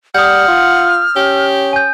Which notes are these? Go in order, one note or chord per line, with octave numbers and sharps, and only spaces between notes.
G3 F#5 D#6 F6 G6
F4
C#4 G4
G#5 G6